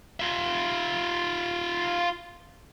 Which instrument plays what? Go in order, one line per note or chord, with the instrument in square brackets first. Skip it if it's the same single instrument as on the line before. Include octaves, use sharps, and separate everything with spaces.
[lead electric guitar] F4 E5